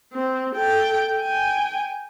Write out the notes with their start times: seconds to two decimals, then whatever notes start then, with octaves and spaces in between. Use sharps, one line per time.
0.13 C4
0.55 A4 G5
1.17 G5 G#5